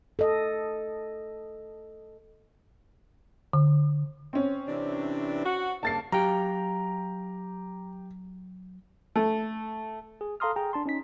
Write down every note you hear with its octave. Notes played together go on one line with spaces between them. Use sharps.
A4 D#5
D3
C4 C#4
C3 E3 D4
F#4 F#5
G2 C#3 A#3 A5 A6 C7
F#3 G4 F5 G5 A#5
A3
G#4
A4 F5 A#5 C6 D#6 F6
G#4 G5 A#5
D4 A5 C6
C#4 D#4 B6